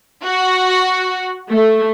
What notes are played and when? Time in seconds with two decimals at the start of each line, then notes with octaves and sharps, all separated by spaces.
0.24 F#4
1.50 A3